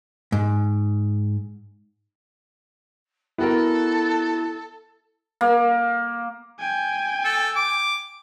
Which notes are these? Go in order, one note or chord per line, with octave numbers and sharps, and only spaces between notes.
G#2
B3 E4 F#4 A4 A#4
A#3
G5 G#5
A4
D6